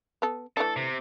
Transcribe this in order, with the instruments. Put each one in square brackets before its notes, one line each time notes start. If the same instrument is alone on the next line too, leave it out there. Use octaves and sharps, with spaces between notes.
[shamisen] B3 A4
[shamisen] E3 A3 D4 [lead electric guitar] A4
[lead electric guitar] C3